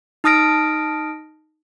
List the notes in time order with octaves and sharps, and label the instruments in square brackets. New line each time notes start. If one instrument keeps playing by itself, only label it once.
[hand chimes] D#4 A5 D#6 F6 A#6 D7